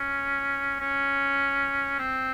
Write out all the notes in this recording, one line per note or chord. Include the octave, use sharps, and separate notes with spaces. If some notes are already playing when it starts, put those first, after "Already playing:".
Already playing: C#4
C#4
C4